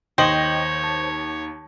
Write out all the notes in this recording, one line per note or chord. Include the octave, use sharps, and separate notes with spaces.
D#2 C5 C#5 D#5 G5 A#6 F#7
A5